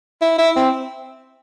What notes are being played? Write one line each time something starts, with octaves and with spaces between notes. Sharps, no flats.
E4
E4
C4